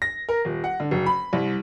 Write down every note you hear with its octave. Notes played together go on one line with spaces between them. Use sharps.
A#6
A#4
D#1
F#5
D3
F#1
B5
C2